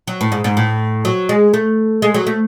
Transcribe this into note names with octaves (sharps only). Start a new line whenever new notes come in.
F#3
A2
G#2
G#2
A2
F#3
G#3
A3
G#3
F#3
A3